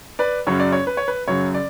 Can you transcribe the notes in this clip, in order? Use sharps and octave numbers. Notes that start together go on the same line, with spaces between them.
B4 D5
F#2 C#3 F#3 C#5
D5
C#5
B4
C#5
B4
F#2 C#3 F#3 C#5
D5